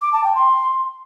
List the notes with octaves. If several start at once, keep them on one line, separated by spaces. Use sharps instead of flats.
D6
A5
G5
C6